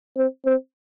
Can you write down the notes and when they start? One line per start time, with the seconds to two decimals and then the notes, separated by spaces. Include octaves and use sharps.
0.17 C4
0.46 C4